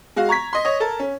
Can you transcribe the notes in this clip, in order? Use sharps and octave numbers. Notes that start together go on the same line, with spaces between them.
G#3 F#4 F5
A#5 C#6 G#6 B6
D#5 C6
C#5 D#5
A4 A#4
C#4